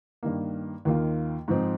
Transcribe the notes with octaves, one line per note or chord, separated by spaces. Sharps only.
G2 D#3 A#3
D#2 D#3 A#3 F4
G#2 F3 C4